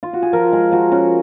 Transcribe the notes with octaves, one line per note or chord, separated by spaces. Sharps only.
F4
F#4
G#4
F3 A#4
G#3 G#4
F3 F#4
C#4 F#4